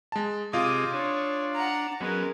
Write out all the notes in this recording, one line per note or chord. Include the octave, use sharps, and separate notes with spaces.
G#3 A5
C3 F4 G#4 D#5 F5 D6 D#6
D4 C#5
F#5 A#5
F#3 G#3 B3 C#4 A#4